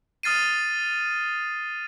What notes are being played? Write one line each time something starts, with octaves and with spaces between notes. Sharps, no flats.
D#6 F6 A6 C7 D#7